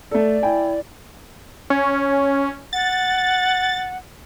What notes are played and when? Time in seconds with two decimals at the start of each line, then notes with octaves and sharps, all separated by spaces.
0.11 A3 A4 D5
0.43 E4 G5 G#5
1.70 C#4
2.73 F#5 A6